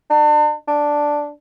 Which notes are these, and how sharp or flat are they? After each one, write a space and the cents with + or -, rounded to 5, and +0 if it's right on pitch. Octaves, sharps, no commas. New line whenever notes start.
D4 +35
D4 +0